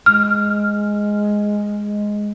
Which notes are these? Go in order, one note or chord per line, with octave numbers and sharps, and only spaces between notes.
G#3 F6